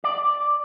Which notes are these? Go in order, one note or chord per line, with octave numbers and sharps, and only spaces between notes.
D5